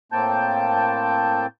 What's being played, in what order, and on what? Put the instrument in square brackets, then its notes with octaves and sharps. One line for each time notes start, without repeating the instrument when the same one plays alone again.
[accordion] A2 A#3 C4 G5 A5 G6